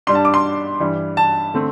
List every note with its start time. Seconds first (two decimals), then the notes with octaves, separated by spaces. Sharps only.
0.07 G2 G3 D4 C6
0.15 A5
0.25 D6
0.34 C6
0.80 G2 E3 G3
1.17 A5
1.54 D3 A3 C4